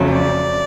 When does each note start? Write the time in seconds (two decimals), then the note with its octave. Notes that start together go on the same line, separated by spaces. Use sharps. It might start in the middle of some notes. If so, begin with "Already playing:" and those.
Already playing: F2 C#3 F#3 A3
0.10 D5